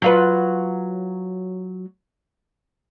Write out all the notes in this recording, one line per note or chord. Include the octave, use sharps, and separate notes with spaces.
F#3 F4 B4